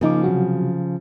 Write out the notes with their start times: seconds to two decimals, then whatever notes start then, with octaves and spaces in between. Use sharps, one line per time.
0.01 C#3 F3 A#3 D#4 D6
0.24 C3 F#3 F#4